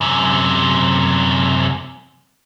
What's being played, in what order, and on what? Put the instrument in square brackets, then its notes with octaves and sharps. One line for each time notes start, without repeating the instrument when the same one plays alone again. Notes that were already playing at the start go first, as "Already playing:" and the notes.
[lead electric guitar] F#2 C3